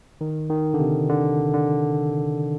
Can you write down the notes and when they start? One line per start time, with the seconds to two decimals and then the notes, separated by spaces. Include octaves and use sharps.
0.21 D#3
0.50 D#3
0.74 D3
0.80 C3
1.09 D3
1.54 D3